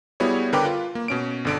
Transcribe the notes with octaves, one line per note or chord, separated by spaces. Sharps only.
G3 B3 E4 F#4 G#4 C#5
D3 A#4 B4 G5 D6
F4
A#3
B2 C#4 D7
G1 D3 D7